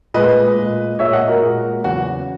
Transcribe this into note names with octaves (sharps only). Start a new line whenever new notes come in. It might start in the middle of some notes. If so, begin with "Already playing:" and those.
A#2 G#3 B4 D#5
A#2 G#3
A#2 G#3 C#5 E5
D#5 F#5
F#4 A#4
A#2 G#3
E2 C#3 F#3 F#4